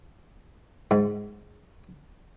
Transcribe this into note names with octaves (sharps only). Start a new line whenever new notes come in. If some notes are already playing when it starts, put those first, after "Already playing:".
G#2